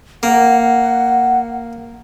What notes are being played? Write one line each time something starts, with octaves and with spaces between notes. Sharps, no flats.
A#3 F#5